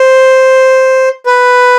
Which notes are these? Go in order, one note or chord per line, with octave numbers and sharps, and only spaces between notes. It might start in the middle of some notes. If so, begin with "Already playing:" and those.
Already playing: C5
B4